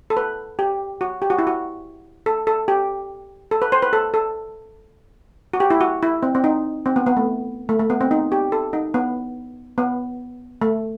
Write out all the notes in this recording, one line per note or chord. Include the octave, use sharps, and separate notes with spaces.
A4
B4
G4
F#4
G4
F#4
E4
F#4
A4
A4
G4
A4
B4
C5
B4
A4
A4
F#4
G4
E4
F#4
E4
C4
C4
D#4
C4
B3
B3
A3
A3
A3
B3
C4
D#4
G4
A4
D#4
B3
B3
A3